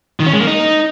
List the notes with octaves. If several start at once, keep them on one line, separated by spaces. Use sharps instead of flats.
D#3
C#4
G#3
A#3
D#4